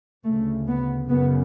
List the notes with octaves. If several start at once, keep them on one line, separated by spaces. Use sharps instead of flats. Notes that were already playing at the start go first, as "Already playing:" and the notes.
D2 C#3 A3
B3
F#2 C#3 B3